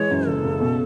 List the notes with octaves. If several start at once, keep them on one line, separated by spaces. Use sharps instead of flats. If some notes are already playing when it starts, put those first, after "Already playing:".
Already playing: E3 G#3 C#5
F#2
F#1 A4
C#3
B2